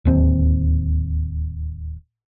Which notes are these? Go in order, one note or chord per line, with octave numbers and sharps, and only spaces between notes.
D1 D#2 C4